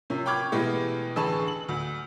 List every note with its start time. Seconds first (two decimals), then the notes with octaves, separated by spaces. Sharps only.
0.10 C3 F3 A#3 C#4
0.26 G5 B5 C#6 D6 F6 G#6
0.52 B2 E3 G#3 A3 B3 G4
1.16 A1 D3 G#4 B4 A5 C#6
1.48 F#7
1.69 D2